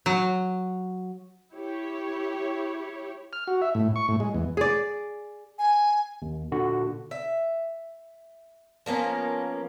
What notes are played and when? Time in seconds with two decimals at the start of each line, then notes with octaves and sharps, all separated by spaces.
0.06 F#3
1.53 E4 G4 C#5
3.33 F6
3.47 F#4
3.62 E5
3.75 A2
3.96 C#6
4.08 A2
4.20 G#3
4.34 E2
4.57 G#4 D5
5.59 G#5
6.22 D#2
6.52 A#2 D3 F#4
7.11 E5
8.86 F3 A#3 B3 C#4